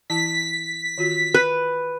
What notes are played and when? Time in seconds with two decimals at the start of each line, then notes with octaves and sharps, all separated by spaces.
0.10 E3 E4 A5 B6
0.98 D#3 F4 F#4
1.34 B4